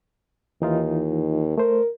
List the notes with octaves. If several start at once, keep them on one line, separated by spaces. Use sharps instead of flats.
D#2 E3 D#4 F4
A3 A#4 C5